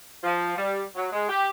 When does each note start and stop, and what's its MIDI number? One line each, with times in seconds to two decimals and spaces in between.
0.24 0.51 53
0.57 0.82 55
0.96 1.07 54
1.12 1.28 56
1.29 1.49 67